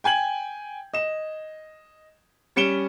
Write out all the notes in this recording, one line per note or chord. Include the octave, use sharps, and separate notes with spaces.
G5 G#5 G#6 F#7
D#5 E7
G3 C#4 C#7 D7 E7 G7